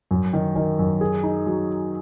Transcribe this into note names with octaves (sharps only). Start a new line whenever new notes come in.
F#2
D#3
D#3
F#2
G#4
D#4
F#3